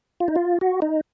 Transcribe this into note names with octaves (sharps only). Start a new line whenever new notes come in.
F4
D#4
F4
F#4
D#4